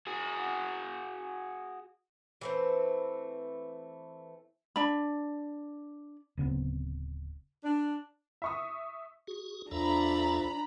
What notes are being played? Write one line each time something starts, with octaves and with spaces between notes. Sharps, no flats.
F#4 G#4
E3 A3 C4
D4 B5
D1 C#3 B3 C4
D4
E5 C#6 D#6
F#4 G#4
E2 F3 D4 A4 E5 A#5 B5